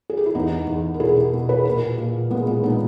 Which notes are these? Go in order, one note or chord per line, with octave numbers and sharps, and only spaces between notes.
G#4
G4
E4
E2 B3 D#4
E2
A#4
B2 E4 G#4
G4 A#4
B2
G#4 B4
A#2 G4 A#4
A#2
A#2 G#3 B3
G#3 B3
A#2 B3 D#4